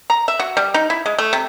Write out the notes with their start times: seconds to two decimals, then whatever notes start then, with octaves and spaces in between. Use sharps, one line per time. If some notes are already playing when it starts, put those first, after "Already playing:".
0.10 A#5
0.28 E5
0.40 F#4
0.57 G3
0.74 D#4
0.90 E4
1.06 G#3
1.19 A3
1.33 C3